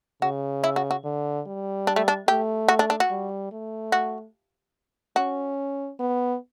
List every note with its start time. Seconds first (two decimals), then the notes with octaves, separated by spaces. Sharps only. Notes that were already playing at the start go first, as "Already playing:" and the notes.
0.22 C#3 F#4
0.64 E4
0.76 F#4
0.91 F#4
1.04 D3
1.46 G3
1.87 D4
1.96 A3
2.08 D4
2.28 A3 G4
2.68 F#4
2.79 D4
2.90 D4
3.00 F#4
3.10 G3
3.52 A3
3.92 F#4
5.16 C#4 F#4
5.99 B3